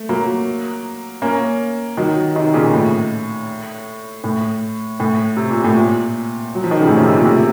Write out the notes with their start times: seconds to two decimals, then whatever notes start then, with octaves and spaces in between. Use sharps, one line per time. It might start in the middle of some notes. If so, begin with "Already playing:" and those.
Already playing: A3
0.09 F#3 A#3
1.22 A#3 C#4
1.97 D#3 F#3
2.35 C3 D#3
2.54 A#2 C#3
2.74 A2
4.24 A2
5.00 A2
5.36 C3
5.50 A#2
5.64 A2
5.76 A#2
6.55 F#3
6.64 F3
6.71 D#3
6.80 C#3
6.87 A2 C3
6.96 A#2 C#3
7.07 A2 C3
7.16 A#2
7.25 A2 C3